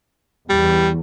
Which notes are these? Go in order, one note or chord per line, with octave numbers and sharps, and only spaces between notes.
E2 G3